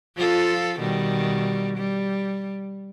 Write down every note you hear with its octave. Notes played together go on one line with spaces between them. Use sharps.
F3 F4 A4
B2 D#3 G3
G3